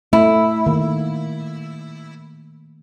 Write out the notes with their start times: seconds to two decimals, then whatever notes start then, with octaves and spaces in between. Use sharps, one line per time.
0.13 A3 E4
0.66 D#3 A#3